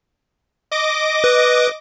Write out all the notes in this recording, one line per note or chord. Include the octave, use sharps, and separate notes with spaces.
D#5 D6 A#6
B4